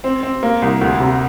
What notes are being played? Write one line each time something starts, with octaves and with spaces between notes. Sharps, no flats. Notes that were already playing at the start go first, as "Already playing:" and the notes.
C4
C4
A#3
C2
D2
C3